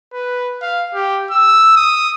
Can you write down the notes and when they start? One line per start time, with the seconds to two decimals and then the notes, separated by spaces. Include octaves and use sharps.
0.13 B4
0.62 F5
0.94 G4
1.31 E6
1.77 D#6